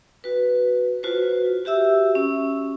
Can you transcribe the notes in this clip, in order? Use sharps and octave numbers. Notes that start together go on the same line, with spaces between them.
F#4 B4
F4 F#4 B4 C5
F#4 G4 E5 E6
C#4